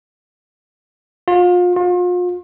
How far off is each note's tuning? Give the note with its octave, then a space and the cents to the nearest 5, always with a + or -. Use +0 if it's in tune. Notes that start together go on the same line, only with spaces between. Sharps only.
F4 +35
F4 +40